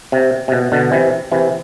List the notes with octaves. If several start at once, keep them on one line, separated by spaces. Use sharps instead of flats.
C3
C3
B2
B2 D3
C3 E3
C3 E3